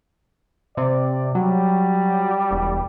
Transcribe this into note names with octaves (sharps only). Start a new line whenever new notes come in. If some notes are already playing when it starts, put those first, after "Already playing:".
C3 D5
F#3 G3
E1